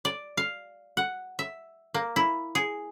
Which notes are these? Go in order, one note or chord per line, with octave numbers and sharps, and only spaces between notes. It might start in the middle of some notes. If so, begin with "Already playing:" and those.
D5
F5
F#5
E5
A#3
E4
G#4